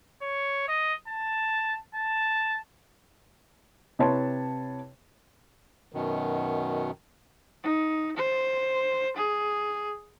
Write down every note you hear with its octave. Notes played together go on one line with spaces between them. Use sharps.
C#5
D#5
A5
A5
C3 E4 B4 C#5 A5 C6
F#2 B2 D#3
D#4
C5
G#4